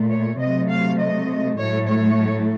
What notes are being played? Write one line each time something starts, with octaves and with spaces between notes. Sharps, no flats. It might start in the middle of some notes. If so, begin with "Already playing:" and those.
Already playing: A#2 A3
C#5
C3 F#3 A3 D#5
F5
D#5
A2 F#3 A3 C#5
C#5